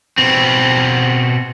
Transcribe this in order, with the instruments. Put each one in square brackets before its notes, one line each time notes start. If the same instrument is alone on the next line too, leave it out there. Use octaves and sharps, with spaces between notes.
[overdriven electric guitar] B2 C4